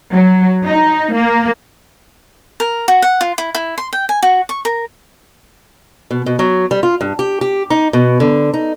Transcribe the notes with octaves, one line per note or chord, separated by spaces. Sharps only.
F#3
D#4
A#3
A#4
F#4
F#5
F4
E4
E4
C6
G5
G#5
F#4
C#6
A#4
B2
B2
F#3
G3
F4
G2
G4
G4
D#4
B2
D3
D#4